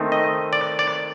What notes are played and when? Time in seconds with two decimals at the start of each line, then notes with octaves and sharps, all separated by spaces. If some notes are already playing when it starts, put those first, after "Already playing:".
Already playing: D#3 A3 C4 D#4
0.12 D#5
0.53 D5
0.79 D5